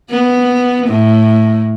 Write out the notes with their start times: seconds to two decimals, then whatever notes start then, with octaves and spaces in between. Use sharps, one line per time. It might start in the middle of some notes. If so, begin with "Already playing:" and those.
0.10 B3
0.88 A2